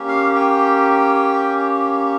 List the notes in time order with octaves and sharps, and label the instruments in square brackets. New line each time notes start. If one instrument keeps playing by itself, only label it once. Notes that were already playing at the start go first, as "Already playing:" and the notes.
Already playing: [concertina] A#3 C#4 G4
F5
G5